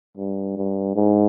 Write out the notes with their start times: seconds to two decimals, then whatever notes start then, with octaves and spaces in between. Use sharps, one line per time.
0.18 G2
0.57 G2
0.96 G#2